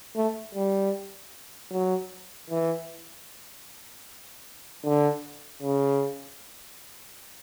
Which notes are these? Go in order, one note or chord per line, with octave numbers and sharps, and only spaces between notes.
A3
G3
F#3
E3
D3
C#3